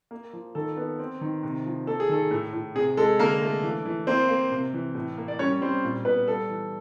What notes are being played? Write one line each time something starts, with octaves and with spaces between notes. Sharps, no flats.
A#3
F3
D#3 A4
B3
C4
D#3
C3
F3
A#3 A4
G#4
D#3 A4
A2
A2
C3 G#4
G#3 A4
D3 A#3 A#4
A3
E3
E3
A#3 C4 C5
A#3
C3
E3
A2
A#3
D5
G3 C#4 C#5
G3 C4 C5
A#2
A#2 B3 B4
G3 A4
E3